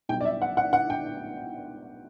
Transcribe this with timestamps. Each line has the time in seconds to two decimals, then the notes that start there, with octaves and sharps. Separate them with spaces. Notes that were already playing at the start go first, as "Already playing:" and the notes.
0.09 B1 B2 G3 G5
0.21 D5
0.25 E5
0.42 F#5
0.57 F#5
0.73 F#5
0.90 G5